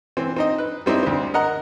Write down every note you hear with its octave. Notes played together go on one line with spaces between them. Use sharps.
E3 C4
C4 D#4 D#5
B4
G3 C4 D#4 E4
D2 C4
A#4 D#5 F#5 A#5